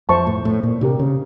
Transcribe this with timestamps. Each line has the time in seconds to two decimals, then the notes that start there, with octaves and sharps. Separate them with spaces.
0.09 F2 C5 E5 A5 C#6
0.27 A2
0.45 A2
0.63 A#2
0.81 C3 D4 G4 A#4
0.99 C#3